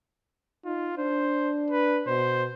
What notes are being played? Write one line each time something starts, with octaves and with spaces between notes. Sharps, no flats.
D#4 F4
D4 C5
B4
B2 C5